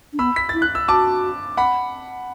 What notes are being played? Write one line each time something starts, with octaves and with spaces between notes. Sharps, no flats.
D4
B3 B5 E6
B6
E4 A6
F#6
E6
F#4 A5 D6
F#5 B5